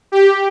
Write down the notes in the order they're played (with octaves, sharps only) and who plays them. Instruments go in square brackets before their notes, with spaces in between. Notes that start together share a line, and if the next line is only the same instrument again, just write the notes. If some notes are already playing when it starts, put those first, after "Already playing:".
[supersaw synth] G4